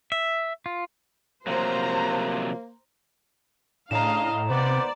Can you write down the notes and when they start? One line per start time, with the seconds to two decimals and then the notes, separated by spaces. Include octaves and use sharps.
0.12 E5
0.66 F4
1.47 C3 F3 F#3 A#3 C5 A#5
3.91 A2 C#3 D4 D#5 F5 A#5 E7
4.50 D#2 C3 B3 C5 D5